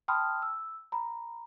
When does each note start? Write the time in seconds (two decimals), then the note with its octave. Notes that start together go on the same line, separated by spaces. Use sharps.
0.08 G5 A5 B5 C6 D#6 F6
0.42 E6
0.92 A#5 B5